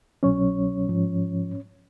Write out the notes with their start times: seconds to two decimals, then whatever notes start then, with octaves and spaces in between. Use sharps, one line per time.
0.23 C2 B2 F#3 C#4 C#5
0.89 G#2 F3